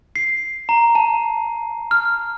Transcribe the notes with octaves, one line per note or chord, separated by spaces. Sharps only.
C7
A#5
A5
F6